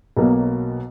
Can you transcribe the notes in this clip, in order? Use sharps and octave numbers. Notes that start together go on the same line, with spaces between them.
B1 B2 F#3 A#3